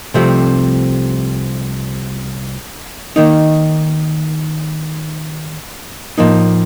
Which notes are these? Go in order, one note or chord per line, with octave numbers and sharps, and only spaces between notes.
C2 C3 F3 A3 C4
D#3 A#3 D#4
A2 F3 A#3 D#4